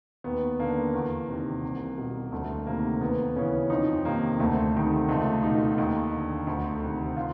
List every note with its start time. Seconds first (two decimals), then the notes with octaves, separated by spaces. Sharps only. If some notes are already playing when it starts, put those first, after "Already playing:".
0.24 D#2 B3
0.59 D3 A#3
0.94 E2
1.28 C3 D#3
1.63 C2
1.98 B2
2.32 D2 A3
2.67 C3 D#3 A#3
3.01 D#2 B3
3.36 C#3 E3 C#4
3.70 F2 D#4
4.05 C3 D#3 A#3
4.40 D2 A3
4.74 C3 D#3
5.09 C#2 A3
5.43 B2 D#4
5.78 D#2
6.13 D3
6.47 D2
6.82 C3 D#3
7.17 F4